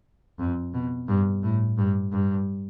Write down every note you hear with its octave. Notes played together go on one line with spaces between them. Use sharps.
F2
B2
G2
A2
G2
G2